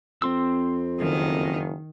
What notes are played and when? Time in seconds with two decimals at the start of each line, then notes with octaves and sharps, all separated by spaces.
0.22 F2 C4 C6 E6
1.00 F#1 D#3